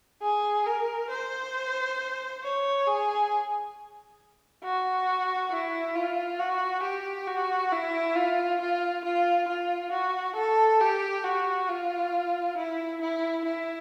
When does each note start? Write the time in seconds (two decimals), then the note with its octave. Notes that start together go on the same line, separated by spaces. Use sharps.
0.22 G#4
0.66 A#4
1.10 C5
2.43 C#5
2.87 G#4
4.63 F#4
5.51 E4
5.95 F4
6.39 F#4
6.83 G4
7.27 F#4
7.72 E4
8.15 F4
8.61 F4
9.05 F4
9.48 F4
9.92 F#4
10.36 A4
10.80 G4
11.24 F#4
11.69 F4
12.57 E4
13.01 E4
13.44 E4